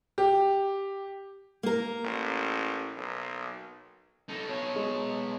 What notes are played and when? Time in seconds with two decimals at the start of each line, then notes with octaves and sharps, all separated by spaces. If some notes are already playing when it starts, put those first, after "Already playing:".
0.18 G4
1.63 A#3 A#4
2.04 A1
2.97 B1
4.29 D#4 A4
4.48 B2 C#5
4.76 G#3